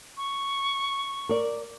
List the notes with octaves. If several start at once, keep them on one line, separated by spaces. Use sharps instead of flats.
C#6
A#4 D5